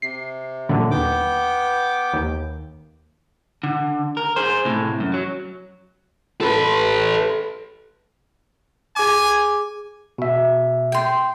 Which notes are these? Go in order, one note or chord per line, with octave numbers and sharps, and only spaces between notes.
C3 C7
A#2 D3 F#3
D#2 B3 G5 D6
D#2
D3
A#4
G#4 C5
A2 C3
F#2
F#3
A4 B4
G#4 G#5 D6
B2 E5
G5 C6